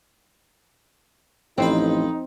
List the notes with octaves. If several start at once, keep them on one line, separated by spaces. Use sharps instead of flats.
A1 F2 C4 D#4 B4 C5